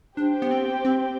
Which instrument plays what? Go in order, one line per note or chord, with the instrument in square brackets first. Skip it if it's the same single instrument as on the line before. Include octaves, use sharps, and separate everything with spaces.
[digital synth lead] D4 [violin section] G4 C5 G5
[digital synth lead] B3
C4
C4